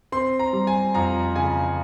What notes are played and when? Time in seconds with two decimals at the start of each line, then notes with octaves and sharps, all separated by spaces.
0.12 C4 C6
0.39 A#5
0.53 G3
0.67 G#5
0.94 F2 A#5
1.36 C#3 G#5